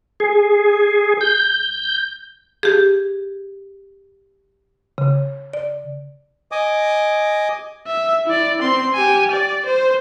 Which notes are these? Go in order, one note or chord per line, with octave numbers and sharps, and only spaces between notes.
G#4
G6
G4 G#4
C#3
D5
D#5 G#5 D6 D#6
E5
E4 D5
C4 C6
G4 G#5
D5
C5